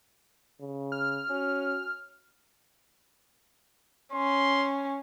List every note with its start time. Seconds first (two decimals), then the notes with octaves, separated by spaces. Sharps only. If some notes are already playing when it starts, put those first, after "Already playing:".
0.61 C#3
0.92 F6
1.30 C#4 F#4
4.13 C#4 C6